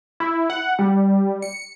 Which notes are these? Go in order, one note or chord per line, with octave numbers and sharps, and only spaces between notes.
E4
F#5
G3
C#7